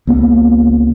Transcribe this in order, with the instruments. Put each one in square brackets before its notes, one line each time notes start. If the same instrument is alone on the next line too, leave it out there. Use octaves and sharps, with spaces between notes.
[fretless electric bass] C#2 A#3 B3